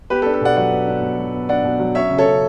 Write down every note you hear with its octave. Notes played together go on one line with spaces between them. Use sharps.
B3 G4 B4
A4
D4
A4
B2 D5 F#5
F#3 D5 F#5
B3
D4
B2
F#3
B3
D4 D5 F#5
B2
F#3
C#4 C#5 E5
C#3
A4 C#5
C#3